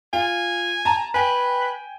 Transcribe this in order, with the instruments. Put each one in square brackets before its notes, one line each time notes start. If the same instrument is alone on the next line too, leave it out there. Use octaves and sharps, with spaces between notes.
[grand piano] F4 [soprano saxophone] G#5
[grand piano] A5 A#5
[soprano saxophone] B4 [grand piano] G5 G#5